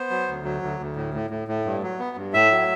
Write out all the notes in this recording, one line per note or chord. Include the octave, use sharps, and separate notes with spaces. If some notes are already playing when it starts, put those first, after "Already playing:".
Already playing: B3 C5
F#3
D2
F#3
D2
D2
A2
A2
A2
A2
G2
F#3
B3
G2
A2 E5
F#3